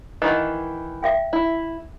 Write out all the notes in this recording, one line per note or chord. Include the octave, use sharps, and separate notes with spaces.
D#3 E3 D#5 F#5
E5 F5 G5
E4